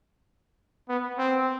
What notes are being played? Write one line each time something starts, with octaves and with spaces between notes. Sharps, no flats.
B3
C4